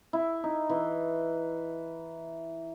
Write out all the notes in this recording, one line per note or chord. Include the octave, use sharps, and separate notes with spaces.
E4
D#4
E3